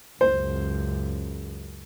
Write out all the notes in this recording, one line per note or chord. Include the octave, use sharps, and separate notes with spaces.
C#2 F#2 C5